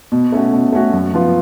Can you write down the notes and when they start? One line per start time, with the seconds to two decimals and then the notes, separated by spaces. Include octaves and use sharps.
0.12 B2
0.32 A3 C#4 F#4
0.53 B2
0.73 A3 C#4 F#4
0.93 F#2
1.14 F3 B3 F4